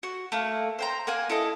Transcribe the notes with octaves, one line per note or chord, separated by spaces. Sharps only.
F#4
A3 A#3
C5 G5 A#5
A#3 F#5 G#5
E4 A4 D#5